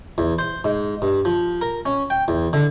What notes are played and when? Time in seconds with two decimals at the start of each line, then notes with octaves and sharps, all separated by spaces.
0.18 E2
0.39 C5
0.65 G#2
1.02 G2
1.25 F3
1.61 A#4
1.86 C#4
2.10 G5
2.28 E2
2.53 D3